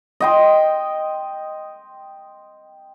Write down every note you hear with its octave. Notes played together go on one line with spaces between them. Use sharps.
D#5 G5 C6